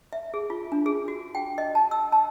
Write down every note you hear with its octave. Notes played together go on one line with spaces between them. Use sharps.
E5
G#4
F4
D4
G#4
F#4
G5
D#5
A5
E6
A5